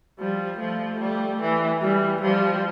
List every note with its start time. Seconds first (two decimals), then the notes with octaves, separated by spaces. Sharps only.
0.19 F3 G3
0.60 F3 A3
1.00 G3
1.41 E3
1.81 E3 G3
2.21 F3 G3